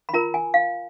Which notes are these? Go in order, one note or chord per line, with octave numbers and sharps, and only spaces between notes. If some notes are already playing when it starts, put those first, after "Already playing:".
B5
F4 A#4 A#5
G#5
F5